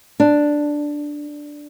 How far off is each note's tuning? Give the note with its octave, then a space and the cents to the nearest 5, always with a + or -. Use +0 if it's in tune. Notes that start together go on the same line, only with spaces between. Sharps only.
D4 +0